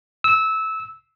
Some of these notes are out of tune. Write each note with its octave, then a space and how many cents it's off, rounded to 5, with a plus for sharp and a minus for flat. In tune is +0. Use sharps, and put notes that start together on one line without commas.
E6 -20